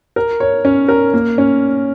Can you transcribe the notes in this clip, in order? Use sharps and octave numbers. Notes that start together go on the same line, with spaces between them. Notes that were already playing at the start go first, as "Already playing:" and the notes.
A#4
C#5
C#4
A#4
A#3
C#4